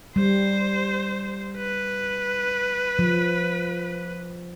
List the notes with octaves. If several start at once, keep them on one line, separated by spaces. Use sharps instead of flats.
G3 C5
B4
F3